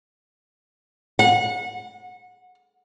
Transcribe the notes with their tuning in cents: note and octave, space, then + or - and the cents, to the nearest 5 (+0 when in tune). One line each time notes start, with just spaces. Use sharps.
F#5 -30